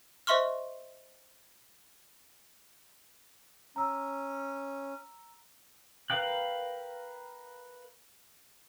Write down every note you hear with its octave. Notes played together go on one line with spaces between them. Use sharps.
C5 D#5 E5 C6 C#6 F6
C#4 A#5 E6
A#4 B4 F5 G5 F#6